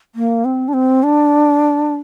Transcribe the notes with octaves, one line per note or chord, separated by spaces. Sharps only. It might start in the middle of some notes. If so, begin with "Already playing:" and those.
A#3
C4
D4
C4
D4